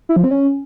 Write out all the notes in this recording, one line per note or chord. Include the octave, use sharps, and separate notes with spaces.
E4
F3
C4
C#4